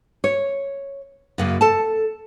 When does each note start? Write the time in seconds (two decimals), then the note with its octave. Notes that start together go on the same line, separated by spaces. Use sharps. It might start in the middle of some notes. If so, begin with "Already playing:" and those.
0.24 C#5
1.38 F#2 C#3 A#3
1.61 A4 A5